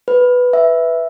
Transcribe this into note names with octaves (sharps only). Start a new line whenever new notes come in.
B4
E5